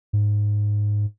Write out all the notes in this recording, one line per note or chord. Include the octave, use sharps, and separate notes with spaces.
G#2